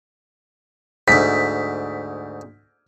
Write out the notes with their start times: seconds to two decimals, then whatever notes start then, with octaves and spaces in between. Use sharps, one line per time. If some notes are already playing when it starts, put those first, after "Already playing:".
1.08 D2 G#2 B6